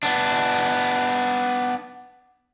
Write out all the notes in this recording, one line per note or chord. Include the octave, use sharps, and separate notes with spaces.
B3 D4